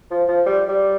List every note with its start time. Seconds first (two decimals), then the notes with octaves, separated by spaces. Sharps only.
0.11 F3
0.28 F3
0.46 G3
0.69 G3